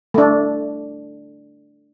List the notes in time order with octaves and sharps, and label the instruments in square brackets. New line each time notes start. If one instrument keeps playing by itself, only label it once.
[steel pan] A3 D4